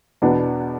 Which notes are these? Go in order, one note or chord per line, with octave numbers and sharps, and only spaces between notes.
E2 B2 B3 D4